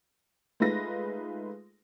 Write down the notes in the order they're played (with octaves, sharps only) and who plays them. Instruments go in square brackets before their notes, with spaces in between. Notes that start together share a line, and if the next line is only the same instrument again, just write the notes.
[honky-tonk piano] G#3 A3 D#4 F4 B4 A#6